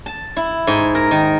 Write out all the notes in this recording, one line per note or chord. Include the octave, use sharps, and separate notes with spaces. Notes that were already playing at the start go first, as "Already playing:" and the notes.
A5
E4
G#2
A#4
D#3